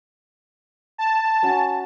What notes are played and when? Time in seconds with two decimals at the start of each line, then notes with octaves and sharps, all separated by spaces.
0.98 A5
1.43 C#4 F#4